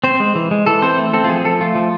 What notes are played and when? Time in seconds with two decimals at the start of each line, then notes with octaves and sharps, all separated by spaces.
0.04 C4 C5
0.20 G#3
0.35 E3
0.51 G#3
0.66 E3 A4
0.82 C4 C5
0.98 A3
1.13 C4 A4
1.24 F4
1.29 F3 G#4
1.45 F3 A4
1.61 A3 F4
1.75 F3